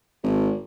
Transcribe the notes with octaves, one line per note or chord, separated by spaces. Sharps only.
G#1